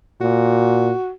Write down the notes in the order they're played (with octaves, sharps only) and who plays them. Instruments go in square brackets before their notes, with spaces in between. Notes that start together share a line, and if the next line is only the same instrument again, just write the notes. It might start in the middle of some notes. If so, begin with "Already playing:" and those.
[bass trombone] A#2 [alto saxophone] F#4